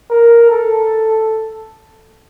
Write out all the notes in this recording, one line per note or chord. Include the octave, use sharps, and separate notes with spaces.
A#4
A4